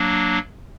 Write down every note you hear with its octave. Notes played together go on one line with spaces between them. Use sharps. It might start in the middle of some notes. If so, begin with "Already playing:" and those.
Already playing: F#3 A#3 D4